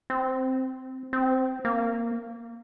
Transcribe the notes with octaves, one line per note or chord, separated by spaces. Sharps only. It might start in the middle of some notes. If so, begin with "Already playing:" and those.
C4
C4
A#3